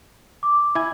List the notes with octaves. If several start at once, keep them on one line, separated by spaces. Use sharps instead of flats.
D6
E4 G#5